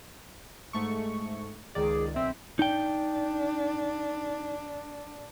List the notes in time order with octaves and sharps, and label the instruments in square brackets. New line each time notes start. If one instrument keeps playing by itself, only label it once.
[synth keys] G#2 A3 C#6
[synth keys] C#2 D#3 D5 [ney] G#4
[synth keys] B1 C4 [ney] E5
[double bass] D4 [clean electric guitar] D#4 G5